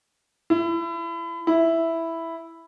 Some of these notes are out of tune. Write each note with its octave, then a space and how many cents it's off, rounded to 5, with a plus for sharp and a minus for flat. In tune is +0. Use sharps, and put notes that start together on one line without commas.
E4 +30
E4 +0